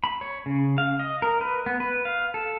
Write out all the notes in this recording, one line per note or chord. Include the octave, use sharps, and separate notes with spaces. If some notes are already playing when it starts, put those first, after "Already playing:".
B5
C#5
C#3
F5
D#5
A#4
B4
B3
B4
F5
A4